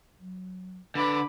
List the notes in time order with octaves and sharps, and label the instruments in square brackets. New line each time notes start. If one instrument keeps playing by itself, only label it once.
[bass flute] F#3
[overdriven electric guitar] D3 D5 [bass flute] B4 [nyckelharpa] B5 D6